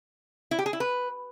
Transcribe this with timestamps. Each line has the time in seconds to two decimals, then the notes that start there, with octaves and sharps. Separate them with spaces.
0.51 E4
0.59 G4
0.66 G#4
0.73 E4
0.80 B4